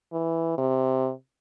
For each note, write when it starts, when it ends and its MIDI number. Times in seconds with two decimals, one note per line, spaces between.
0.13 0.55 52
0.58 1.11 48